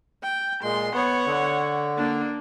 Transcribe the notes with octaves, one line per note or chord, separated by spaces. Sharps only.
G5
A#2 G#3 C6
B3 C#5 F#5
D3
A#3 D4